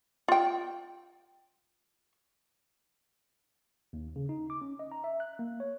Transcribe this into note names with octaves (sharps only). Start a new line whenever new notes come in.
F4 G5
D#2
C#3
D#4
D6
C#4
D#5
A#5
E5
F#6
A#3
C#5